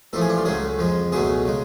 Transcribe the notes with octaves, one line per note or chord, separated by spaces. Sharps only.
A1 A2 F3 A3 A4
G#4
D4
F4
C#2 C#3 F#3 A3 G#4
F2 F3 G#3
C#2 B2 F#3 A3 G#4
C#3 G#3